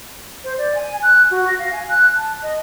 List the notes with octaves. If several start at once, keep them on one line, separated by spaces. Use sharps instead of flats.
C5
D5
G#5
F#6
F#4
A#6
F5
G#5
F#6
A5
D#5